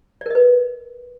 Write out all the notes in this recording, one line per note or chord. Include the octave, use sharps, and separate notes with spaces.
A#4 B4 D5 D#5